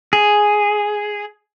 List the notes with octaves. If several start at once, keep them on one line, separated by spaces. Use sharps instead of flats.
G#4